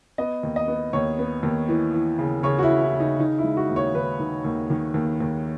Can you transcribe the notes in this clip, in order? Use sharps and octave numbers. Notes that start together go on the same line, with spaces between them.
B3 D#5
D#2
D#5
B3
D#2 C#5
B3
D#2
E3
E3
C#3
C#3 C#5
F#4
E4
E3
E4
C#3
D#4
D#3 D#4
E4
G#3
F#4
D#2
C#5
D#3 B4
D#3
D#2
D#3
D#2
D#2